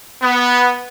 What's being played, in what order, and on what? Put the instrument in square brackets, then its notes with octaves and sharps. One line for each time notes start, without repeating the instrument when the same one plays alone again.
[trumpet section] B3